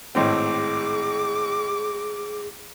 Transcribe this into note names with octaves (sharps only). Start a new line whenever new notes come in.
G#1 A2 C4 G#4 D6